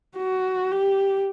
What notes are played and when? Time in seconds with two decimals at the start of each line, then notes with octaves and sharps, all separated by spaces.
0.17 F#4
0.71 G4